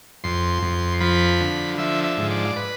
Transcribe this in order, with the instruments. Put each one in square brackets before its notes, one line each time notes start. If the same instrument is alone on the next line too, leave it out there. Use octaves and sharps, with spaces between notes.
[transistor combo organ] F2 C6
F2
F3 B5
D3
F3 E5
E5
G#2
D5
B4